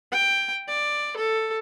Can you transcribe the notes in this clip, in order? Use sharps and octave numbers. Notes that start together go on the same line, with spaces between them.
G5
D5
A4